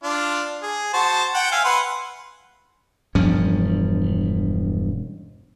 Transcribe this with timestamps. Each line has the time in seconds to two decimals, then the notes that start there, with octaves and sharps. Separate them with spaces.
0.03 D4 F4
0.63 G#4
0.93 F#4 C5 A5
1.34 F#5 G5
1.52 E5 F5 G#5
1.65 B4 F#5 C6
3.15 E1 G2 F3 C#4